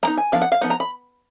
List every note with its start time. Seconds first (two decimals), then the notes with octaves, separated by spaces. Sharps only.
0.03 G#3 B3 D#4 A#5
0.17 G#5
0.32 F3 B3 D4 F5
0.42 F#5
0.52 F5
0.61 F3 B3 D#4 F#5
0.70 A#5
0.80 B5